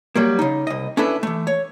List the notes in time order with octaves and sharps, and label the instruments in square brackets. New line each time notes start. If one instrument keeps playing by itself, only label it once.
[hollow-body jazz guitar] F#3 G3 A#3
C#3 D#4
C2 D#5
C#4 D4 E4 A4 B4
E3 A3
C#5